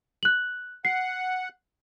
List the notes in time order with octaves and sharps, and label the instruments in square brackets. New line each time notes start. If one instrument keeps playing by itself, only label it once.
[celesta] F#6 F#7
[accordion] F#5 [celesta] C7